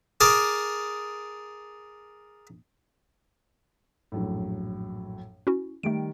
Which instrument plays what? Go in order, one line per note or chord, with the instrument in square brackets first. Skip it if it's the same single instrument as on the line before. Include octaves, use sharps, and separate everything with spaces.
[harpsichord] G#4 A#4 A5 D6
[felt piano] A#1 F#2 A2
[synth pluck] C#4 E4 F#4
[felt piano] D#3 G3 [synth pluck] A3 D7